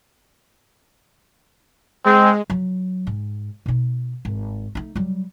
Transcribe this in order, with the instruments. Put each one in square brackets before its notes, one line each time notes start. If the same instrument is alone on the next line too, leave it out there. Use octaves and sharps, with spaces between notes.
[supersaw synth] G#3 [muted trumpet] C4
[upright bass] F#3
G#2
B2 D#4
G#1
A3 D#4
F#3 G3